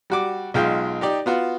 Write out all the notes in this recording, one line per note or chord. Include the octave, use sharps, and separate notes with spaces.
G3 F#4 D6
B1 G#3 F4 G5
D#4 G4 D5
B3 F4 F#4